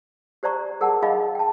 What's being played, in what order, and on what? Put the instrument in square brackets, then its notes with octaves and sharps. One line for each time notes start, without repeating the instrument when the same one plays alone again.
[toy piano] G4 C5 D5 A#5 C#6
G#4 A#4 F#5 A5
D#4 G#4 D#5 F5 B5 D6
G5 A5